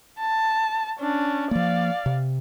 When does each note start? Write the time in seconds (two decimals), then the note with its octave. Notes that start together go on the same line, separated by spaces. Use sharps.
0.19 A5
0.99 C#4 D4
1.51 F3 A#3 D5 F5
2.06 C3